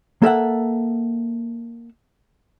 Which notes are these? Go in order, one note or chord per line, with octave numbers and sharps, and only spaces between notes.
A#3 A4 E5 F#5